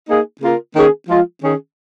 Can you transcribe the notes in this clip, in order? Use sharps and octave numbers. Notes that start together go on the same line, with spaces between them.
A#3 D#4 G#4
C#3 A#3 F4 A#4
D#3 A#3 C#4 G#4
F3 G#3 F4
D#3 C#4 G#4